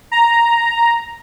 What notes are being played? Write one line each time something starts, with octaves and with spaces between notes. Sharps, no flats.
A#5